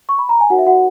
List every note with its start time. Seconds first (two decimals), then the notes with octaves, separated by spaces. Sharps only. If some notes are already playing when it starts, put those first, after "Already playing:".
0.09 C#6
0.19 B5
0.29 A#5
0.40 G#5
0.50 D#4 F#4 A#4 C#5 F#5
0.58 E5
0.66 F#4 F#5